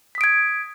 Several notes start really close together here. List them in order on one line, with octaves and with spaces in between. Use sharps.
B6 D#6 D7 G#6